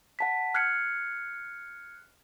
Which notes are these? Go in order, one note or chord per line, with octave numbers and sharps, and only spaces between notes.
F#5 A5 B6
F6 F#6 G#6 C7 C#7